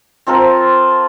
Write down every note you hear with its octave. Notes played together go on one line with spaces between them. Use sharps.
C4 F4 A4 A#4